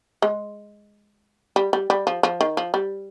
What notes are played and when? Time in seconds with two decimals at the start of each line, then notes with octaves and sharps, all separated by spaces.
0.22 G#3
1.56 G3
1.73 G3
1.90 G3
2.07 F3
2.23 F3
2.41 D#3
2.57 F3
2.74 G3